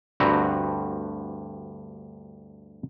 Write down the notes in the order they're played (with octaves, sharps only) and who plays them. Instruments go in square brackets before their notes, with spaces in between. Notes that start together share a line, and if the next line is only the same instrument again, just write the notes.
[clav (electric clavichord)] D2 G2 C4 F#4 B4 A#5